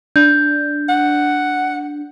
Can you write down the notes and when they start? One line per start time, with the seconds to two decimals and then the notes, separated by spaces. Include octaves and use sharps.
0.16 D4 G6
0.89 F#5